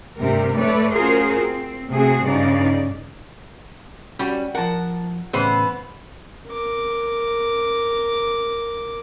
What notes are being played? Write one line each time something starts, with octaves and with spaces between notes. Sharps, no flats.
D2 G2 C3 G3 G4 A#4
A3 A4 B4 C#5 D5
C#4 F4 F#4 G#4 A#4 C5
C4
C3 A3 C4 F#4 G#4
G2 C#3 D#4 D5
G3 C#4 F#4
F3 A#4 F#5 A5
A2 C#3 E3 B3 C5
A#4 D6